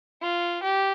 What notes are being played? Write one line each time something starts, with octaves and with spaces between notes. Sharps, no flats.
F4
G4